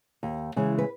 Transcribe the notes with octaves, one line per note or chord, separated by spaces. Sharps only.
D#2
C#3 E3 G#3
B4